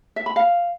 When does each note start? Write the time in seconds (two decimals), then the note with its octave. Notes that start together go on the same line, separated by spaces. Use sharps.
0.16 E5
0.26 B5
0.36 F5